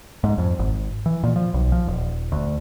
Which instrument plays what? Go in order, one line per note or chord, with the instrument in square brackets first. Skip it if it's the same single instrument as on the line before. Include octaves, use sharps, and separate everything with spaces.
[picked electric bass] G#2
F2
G#1
E3
A#2
F3
B1
F3
D#1
D2